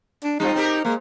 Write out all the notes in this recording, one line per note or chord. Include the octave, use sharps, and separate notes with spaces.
D4
G3 C4 D#4 F4
C4 G4 A#4
G#3 A#3